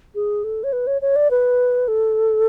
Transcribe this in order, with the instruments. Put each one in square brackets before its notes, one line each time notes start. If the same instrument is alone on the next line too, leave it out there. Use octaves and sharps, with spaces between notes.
[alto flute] G#4
A4
C#5
B4
C#5
C#5
D5
B4
A4